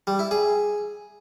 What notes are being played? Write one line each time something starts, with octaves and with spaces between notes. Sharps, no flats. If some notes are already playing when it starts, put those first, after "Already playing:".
G3
E4
G#4